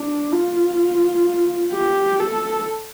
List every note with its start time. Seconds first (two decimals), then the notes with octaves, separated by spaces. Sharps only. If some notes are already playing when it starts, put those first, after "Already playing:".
Already playing: D4
0.32 F4
1.73 G4
2.20 A4